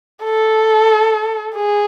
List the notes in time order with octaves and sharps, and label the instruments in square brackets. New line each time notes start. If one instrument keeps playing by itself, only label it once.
[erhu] A4
G#4